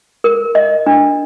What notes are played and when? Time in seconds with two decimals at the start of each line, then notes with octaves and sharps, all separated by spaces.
0.24 A#4
0.55 D#5
0.86 D4